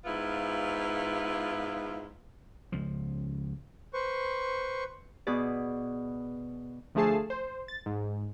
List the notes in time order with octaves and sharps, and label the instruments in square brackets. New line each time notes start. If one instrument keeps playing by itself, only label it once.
[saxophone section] G#2 B3 E4 F4
[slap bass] C#2 F3
[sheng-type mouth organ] B4 C5 C#6
[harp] B2 G#4 B4 D5
[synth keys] D2 F3 A3 G#4 A5 C7
C5
A6
G#2